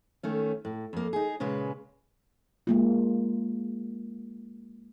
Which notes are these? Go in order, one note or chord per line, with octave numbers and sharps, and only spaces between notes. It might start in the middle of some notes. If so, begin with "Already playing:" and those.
D#3 A3 C#4
A2
F2 A#3
D#4 G#4
A#2 C#3 G#3 B4
G#3 A#3 F4